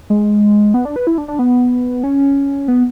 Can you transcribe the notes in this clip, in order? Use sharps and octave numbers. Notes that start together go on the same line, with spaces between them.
G#3
B3
D4
B4
E4
D4
D4
B3
C#4
B3